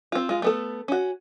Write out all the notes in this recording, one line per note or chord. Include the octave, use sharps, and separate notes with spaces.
C4 F4
G#3 F4
A3 B3 A4
C#4 F#4